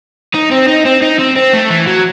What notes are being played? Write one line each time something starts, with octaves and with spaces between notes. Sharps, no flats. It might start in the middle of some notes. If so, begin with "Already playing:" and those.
D#4
C4
D#4
C4
D#4
C4
C4
A3
E3
F#3